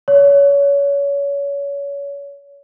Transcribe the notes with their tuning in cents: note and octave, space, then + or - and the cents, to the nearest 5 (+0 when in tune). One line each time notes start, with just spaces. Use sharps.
C#5 +25